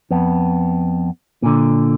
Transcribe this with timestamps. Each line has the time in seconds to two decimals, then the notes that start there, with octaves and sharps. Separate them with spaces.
0.11 F2 B3
1.43 A#2 D3